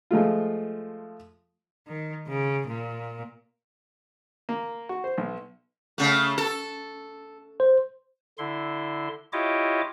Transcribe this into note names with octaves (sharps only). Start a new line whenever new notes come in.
F3 G#3 A3 F4
D#3
C#3
A#2
A#3
F#4
C5
B1
C#3 A3
A4
C5
D3 E4 C6
E4 F4 G4 C#5 D#5 D6